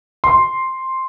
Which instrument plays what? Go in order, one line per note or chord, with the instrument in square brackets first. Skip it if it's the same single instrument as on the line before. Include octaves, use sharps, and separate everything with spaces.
[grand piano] C6